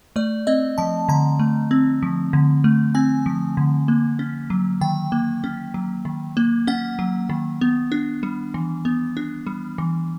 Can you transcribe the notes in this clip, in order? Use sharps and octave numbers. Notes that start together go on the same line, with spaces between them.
A3 D5
C4 D#5
F3 A5
D3 A#5
A3
C4
F3
D3
A3
C4 G#5
F3
D3
A#3
C#4
F#3
D#3 G5
A#3
C#4
F#3
D#3
A#3
C#4 F#5
F#3
D#3
B3
D4
G3
E3
B3
D4
G3
E3